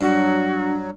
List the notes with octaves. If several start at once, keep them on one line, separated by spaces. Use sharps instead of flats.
G2 F#3 D4 F#4